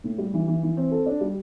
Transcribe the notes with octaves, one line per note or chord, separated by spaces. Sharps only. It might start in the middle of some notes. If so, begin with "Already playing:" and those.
A2
G3
E3
E3
E3
C4
A4
D4
G3